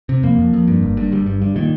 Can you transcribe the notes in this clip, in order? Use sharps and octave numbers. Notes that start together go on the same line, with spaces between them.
C3
F2 A#3
F2
F2
G2
G1
G2
G1 G3
G2
G2
A#2 D#3